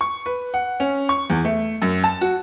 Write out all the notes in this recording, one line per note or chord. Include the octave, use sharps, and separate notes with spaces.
C#6
B4
F#5
C#4
C#6
E2
A3
F#2
A5
F#4